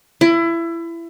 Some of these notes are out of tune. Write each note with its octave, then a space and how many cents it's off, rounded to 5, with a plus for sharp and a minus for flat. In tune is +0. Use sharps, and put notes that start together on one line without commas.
E4 +25